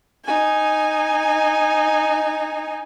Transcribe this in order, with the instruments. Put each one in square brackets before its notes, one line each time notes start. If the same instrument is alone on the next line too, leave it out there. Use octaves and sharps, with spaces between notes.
[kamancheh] D#4 G#5